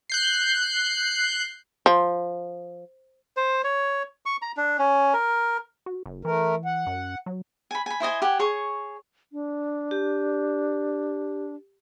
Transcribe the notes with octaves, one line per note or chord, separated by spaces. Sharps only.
F#6 G6 C7
F3
C5
C#5
C#6
A#5
D4
C#4
A#4
F#4
F#1
E3 A3 A#4
F#5
F#2
F#3
G#5 B5
G#5 B5
E4 C5 D#5 G#5
G4 F#5 G#5
G#4 C#5 C#6
D4
G4